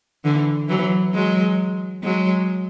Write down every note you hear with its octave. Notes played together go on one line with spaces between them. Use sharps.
D3 E3
E3 F#3
F#3 G#3
F#3 G#3